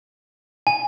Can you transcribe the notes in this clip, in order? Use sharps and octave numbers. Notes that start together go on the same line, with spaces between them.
G#5